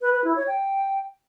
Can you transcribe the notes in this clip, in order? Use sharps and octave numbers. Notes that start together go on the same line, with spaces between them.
B4
B4
E4
C#5
G5